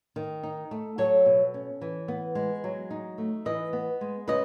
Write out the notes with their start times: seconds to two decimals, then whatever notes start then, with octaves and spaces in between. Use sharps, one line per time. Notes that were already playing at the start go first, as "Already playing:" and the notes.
0.16 D#3
0.43 D#4
0.71 A3
0.98 F#3 A4 C#5
1.26 B2
1.54 C#4
1.81 E3
2.08 B3
2.35 G#3
2.64 F#3
2.91 D#4
3.18 A3
3.45 E3 B4 D#5
3.73 B3
4.01 G#3
4.28 C#3 B4 D#5